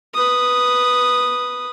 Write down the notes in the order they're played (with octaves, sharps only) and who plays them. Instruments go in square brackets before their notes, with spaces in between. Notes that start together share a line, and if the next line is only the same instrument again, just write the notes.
[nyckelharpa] B4 D#6